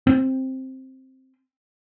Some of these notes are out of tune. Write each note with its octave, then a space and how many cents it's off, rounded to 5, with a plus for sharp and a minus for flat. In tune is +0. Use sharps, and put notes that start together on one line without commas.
C4 +5